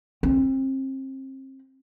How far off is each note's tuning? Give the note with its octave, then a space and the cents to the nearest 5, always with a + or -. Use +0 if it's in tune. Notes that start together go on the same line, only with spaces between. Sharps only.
C4 +30